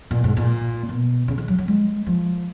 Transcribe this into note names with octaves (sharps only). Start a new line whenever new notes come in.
A#2
G#2
A#2
B2
C#3
D#3
F#3
F#3
G#3
F3